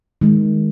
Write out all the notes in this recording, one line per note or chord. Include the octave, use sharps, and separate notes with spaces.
D#3 G#3